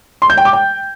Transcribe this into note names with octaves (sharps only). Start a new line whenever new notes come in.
C6
G6
G5
D6
G5